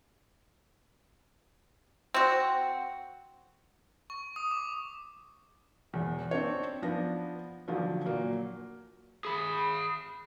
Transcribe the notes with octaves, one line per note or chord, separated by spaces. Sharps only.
C4 F#4
C#6
D#6
D6
E1 E2
C4 D4 C#5
F3 B3 D4 A#6
A1 D3 F3 F#3
A#2 F#3 A#3
G#4 B5